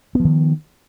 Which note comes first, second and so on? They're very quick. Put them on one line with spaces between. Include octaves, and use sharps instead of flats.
B3 F3 D#3